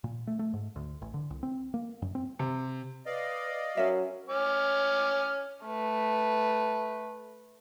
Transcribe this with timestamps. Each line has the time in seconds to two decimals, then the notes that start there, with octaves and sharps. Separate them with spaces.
0.04 A#2
0.27 A3
0.39 A3
0.53 G#2
0.76 D2
1.02 A1
1.14 D3
1.30 C2
1.43 C4
1.74 A#3
2.02 F#2
2.15 C4
2.39 C3
3.06 B4 D5 D#5 F5
3.77 F#3 C#4 A#4 E5
4.29 C#4 D6 F6
5.64 A3 B4